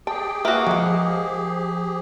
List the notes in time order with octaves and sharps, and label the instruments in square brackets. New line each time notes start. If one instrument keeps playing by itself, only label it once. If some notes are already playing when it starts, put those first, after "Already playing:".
[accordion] G4 G#4 [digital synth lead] G5 [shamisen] A5
[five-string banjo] A#3 F#4 [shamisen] B4 E5
[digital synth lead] F3 [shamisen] G#3 F4